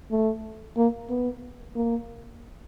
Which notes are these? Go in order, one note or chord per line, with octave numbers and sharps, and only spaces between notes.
A3
A#3
B3
A#3